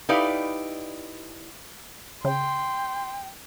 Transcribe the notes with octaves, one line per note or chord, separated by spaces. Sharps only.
D#4 E4 G4 B4 D5 F5
C#3 G5 C6